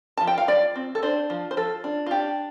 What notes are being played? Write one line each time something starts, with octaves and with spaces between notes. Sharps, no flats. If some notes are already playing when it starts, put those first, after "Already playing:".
F3 A5
G5
F5
F3 D5
C4
A4
D4 C5
F3
C5
F3 A4
D4
F4
D4 G4